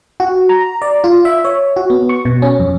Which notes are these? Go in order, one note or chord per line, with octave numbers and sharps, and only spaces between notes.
F#4
A#5
D5
F4
E5
C#5
F#4
B3
C#6
B2
C#4
F2